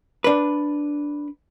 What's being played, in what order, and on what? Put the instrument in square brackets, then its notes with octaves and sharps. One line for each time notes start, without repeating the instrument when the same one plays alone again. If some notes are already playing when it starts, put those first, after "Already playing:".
[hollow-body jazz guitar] D4 B4